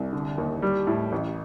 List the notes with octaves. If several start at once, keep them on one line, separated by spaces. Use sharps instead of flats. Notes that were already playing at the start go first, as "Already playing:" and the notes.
Already playing: C2
D3
D#2
G3
A2
A1